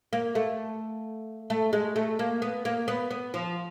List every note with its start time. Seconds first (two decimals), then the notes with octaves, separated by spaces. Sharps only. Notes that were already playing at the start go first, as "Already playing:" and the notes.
0.13 A#3
0.35 A3
1.50 A3
1.73 G#3
1.96 A3
2.19 A#3
2.42 B3
2.65 A#3
2.88 B3
3.11 B3
3.34 F3